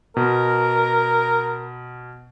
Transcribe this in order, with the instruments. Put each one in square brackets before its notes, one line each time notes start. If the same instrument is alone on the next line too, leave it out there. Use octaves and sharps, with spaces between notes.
[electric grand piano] B2 [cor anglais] A#4